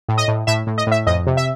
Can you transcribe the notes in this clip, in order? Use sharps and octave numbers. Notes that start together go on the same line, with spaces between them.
A2
D#5
A2
A2 E5
A2
D#5
A2 E5
F2 D#5
C3
E5